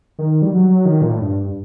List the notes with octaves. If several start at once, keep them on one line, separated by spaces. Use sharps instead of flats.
D#3
G3
F#3
D#3
A#2
A2
G2